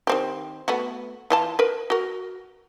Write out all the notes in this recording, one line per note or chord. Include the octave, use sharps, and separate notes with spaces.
D#3 C4 G4
A3 B3 F#4
E3 F4 A5
A#4 B4
F#4 A#4